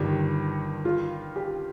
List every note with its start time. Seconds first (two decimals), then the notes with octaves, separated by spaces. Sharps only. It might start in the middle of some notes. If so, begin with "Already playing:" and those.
Already playing: G1 G2 D#3 G4
0.85 F4
1.36 G4